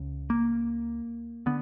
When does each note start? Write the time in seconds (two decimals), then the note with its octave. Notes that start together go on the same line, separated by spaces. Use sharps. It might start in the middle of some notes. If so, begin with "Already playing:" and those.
Already playing: C#2 C#3
0.30 A#3
1.46 D3 B3